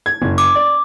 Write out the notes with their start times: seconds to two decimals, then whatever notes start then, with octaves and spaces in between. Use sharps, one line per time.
0.06 G#6
0.22 F#1
0.38 D6
0.55 D5